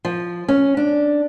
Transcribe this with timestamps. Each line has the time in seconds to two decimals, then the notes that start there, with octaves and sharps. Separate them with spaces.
0.05 F3
0.48 C#4
0.77 D4